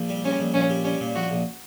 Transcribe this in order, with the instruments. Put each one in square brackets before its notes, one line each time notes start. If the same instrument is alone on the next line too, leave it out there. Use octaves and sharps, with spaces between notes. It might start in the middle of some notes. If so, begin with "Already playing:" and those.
Already playing: [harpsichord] A#1
G3
[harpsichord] G3 [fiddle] C#4
[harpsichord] A#1
[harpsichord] A#1 [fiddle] C#4
[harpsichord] G3
[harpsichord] G3 [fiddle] C#4
[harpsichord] A#2
[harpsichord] A#1 [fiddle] F#4
[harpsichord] A#1